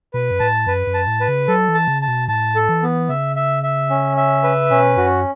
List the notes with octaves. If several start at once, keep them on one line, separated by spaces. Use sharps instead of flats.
B2 B4
F#2
A2 A5
F#2 B4
F#2
A5
A2
B4
C#3
F#3 A4
E3
A5
C#3
A5
B2
A2 A5
A4
E3
B3
C#3 E5
E5
E5
C#4
E5
B4
B2 C#4
F#2 F#4